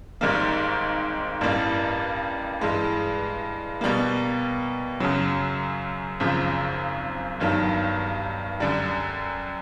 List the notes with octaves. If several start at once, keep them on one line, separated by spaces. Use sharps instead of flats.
G#1 G#2 D#3 G3 A#3
A1 G2 E3 G3 A#3
G2 E3 G#3
B2 G3 A#3
F#2 C#3 F#3
G#1 F#2 C#3 F3
G1 G2 D#3 F#3
F#2 D3 G3